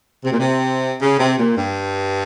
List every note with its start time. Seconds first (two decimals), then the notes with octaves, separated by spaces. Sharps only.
0.24 C3
0.32 A#2
0.39 C3
1.01 C#3
1.19 C3
1.39 A#2
1.57 G2